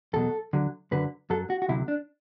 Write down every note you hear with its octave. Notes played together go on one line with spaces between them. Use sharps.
E2 B2 F#3 A4
D2 D3 F#3
F#2 D3 F#3 B4
F#2 F#3 A4
F#4
F#4
D2 C3 F#3 E4
D4